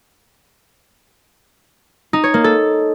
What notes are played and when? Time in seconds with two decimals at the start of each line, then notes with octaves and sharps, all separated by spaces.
2.13 D#4
2.24 C#5
2.34 A#3
2.44 A4